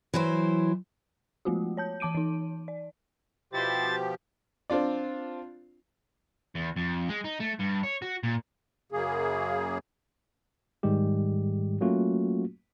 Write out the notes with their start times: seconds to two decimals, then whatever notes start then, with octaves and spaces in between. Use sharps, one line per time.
0.13 E3 F#3 E4 C5
1.45 F3 G#3 A3 B3 F4 F#4
1.77 C#5 A5 G6
2.00 E3 A5 D6 D7 D#7
2.15 E3 D#4
2.68 D5
3.53 B2 F3 E4 G4 C5 A6
4.70 C4 D4 F4 D5
6.55 E2
6.77 F2
7.09 G#3
7.25 D#4
7.40 A3
7.60 G2
7.83 C#5
8.02 F#4
8.23 A#2
8.92 F#2 C#3 A#3 G#4
10.83 G#2 D#3 G3 G#3 G4
11.81 F#3 A3 A#3 C#4 F4 F#4